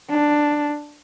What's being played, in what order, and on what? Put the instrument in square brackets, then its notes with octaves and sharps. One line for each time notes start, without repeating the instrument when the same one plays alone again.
[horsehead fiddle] D4